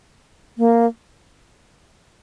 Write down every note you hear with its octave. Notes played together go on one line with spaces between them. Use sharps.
A#3